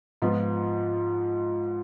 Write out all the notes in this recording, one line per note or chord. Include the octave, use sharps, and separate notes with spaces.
G#2 F3 B3 F4